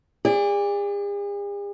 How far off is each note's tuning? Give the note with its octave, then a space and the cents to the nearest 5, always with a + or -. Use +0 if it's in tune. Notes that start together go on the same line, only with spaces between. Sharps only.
G#4 -45 D5 +0